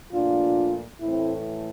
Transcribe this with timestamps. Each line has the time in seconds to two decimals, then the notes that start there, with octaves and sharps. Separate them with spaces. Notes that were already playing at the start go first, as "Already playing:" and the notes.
0.12 A#2 F3 A3 D4 F4
1.01 A2 E3 A3 C4 E4